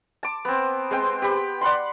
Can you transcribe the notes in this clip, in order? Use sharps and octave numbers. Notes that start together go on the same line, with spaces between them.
A5 D6
B3 C4
G#3 B3 C4 G5
G4 B5
D5 F#5 B5 C6